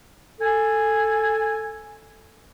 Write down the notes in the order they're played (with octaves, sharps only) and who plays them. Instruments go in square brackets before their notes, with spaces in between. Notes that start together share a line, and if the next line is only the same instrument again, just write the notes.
[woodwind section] A4 G#5